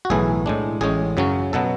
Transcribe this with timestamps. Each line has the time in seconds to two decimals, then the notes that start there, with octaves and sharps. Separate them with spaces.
0.05 F#4
0.10 B1 A2 E3 A3 E4 G#4
0.46 A2 G#3 D4
0.81 A1 A2 G#3 C#4 G#4
1.17 F#2 C#3 F#3 C#4
1.53 B2 F#3 B3 A4